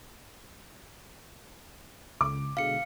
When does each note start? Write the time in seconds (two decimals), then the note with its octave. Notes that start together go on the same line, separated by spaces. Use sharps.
2.21 C#2 D6
2.57 B2 D3 G#3 F5 C#7